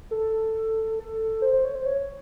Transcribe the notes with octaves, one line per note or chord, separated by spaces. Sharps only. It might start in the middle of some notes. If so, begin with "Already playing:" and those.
A4
A4
C5
C5
C#5
C5
C#5